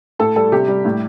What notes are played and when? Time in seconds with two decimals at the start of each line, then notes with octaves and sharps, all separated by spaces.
0.19 A2 A4
0.36 G3 A4
0.52 C3 G4
0.68 G3
0.85 A2